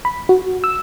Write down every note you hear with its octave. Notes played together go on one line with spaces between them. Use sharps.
B5
F#4
E6